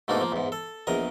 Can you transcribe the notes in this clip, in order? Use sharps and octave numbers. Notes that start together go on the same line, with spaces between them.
G#2 B2 A3 A#3 D4 D#4
F3 A#3
E2 G#2
A4
A#1 E2 A#4 D#5